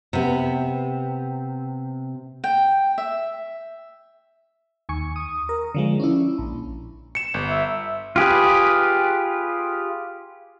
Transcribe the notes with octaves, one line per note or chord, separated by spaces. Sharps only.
C3 B3
G5
E5
D#2 G#5 C#6
D#6
A#4
D3 F3 G#3
C#4 D4 E4
A#1
C#7 E7
G1
E5
F4 G4 G#4 B4